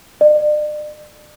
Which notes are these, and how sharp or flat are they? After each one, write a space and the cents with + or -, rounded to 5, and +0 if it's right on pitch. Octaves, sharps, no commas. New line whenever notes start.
D5 +40